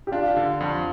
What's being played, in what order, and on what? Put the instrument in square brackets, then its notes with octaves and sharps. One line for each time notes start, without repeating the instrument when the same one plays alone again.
[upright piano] G4
[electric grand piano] D4 [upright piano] F4
[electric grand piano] D3
F2